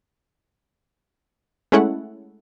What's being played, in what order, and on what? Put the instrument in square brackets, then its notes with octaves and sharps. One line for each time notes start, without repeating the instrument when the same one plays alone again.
[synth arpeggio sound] G#3 A3 C#4 E4 A4 F#5